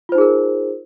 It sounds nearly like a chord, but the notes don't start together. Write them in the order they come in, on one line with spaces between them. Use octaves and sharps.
F4 C5 D#4 G#4 A#4